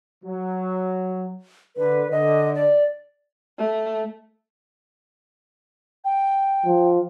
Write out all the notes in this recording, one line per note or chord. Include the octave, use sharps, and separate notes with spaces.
F#3
D3 B4
D3 D#5
D5
A3
G5
F3